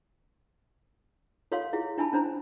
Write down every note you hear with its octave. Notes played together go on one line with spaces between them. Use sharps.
F4 A4 C#5 F5 F#5 C6
E4 F4 G#4 F#5
D4 E4 G#5 A5 B5
C#4 D4 C5 A#5